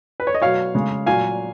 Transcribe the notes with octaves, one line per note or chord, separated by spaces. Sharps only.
B4
C#5
D#5
B2 F#3 C#5 F5
C#3 G#3
A#2 F#3 F5 G#5